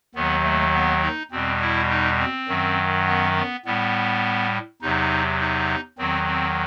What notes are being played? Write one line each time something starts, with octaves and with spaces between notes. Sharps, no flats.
D#2 D#3 F#3 B3
A3
B3
D#4
E2 B2 G3 C4
E4
D#4
C4
F#2 D#3 F#3
B3
B3
A2 G3 B3
E2 C3 F#3 D#4
D#4
E2 D#3 F#3 C4
C4